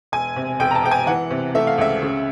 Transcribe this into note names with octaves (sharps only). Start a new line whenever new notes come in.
E1 G#5
C3
E1 G5
A#5
A5
E1 G5
G#5
E3 F#5
C3
A3 E5
F5
C#2 E5
C#3